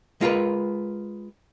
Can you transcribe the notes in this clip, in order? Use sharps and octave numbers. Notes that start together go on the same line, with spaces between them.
G#3 F4 A#4 B4